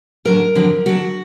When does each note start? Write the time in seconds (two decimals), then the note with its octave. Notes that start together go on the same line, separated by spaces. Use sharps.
0.25 F2 D3 F#3 D4 A#4
0.55 F2 D3 F#3 D4
0.86 F2 D3 F#3 D4 F#4